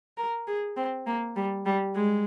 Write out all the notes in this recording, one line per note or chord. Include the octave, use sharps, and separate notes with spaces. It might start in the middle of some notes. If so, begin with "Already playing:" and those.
A#4
G#4
C4
A#3
G3
G3
G#3